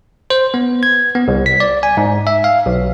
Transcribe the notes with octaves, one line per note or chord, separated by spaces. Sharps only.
C5
B3
G#6
B3
C2
B6
D5
G#5
G#2
E5
F5
B1